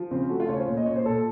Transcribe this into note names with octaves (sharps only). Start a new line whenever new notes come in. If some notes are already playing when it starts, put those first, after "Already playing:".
Already playing: F3
C#3 C4
A3 F#4
F4
C#3 C#5
C5
A#2
D#5
A#2 C#5
C5
A#2 A4